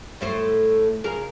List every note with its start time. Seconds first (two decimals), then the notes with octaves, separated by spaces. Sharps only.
0.21 A2 A3 C5
1.04 C#3 G#4 A#4